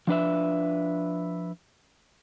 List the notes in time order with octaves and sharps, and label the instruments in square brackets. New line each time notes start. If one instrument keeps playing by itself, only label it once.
[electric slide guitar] F3 D4 B4 E5